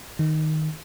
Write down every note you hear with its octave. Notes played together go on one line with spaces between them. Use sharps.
D#3